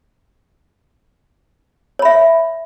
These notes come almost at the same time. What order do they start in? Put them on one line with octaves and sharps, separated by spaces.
C#5 B5 E5